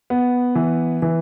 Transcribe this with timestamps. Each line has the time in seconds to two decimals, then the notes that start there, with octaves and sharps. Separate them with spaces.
0.10 B3
0.55 E3
1.02 E3